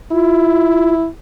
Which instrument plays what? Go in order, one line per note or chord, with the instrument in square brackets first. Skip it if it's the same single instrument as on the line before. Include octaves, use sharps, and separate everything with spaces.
[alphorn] E4 [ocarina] F4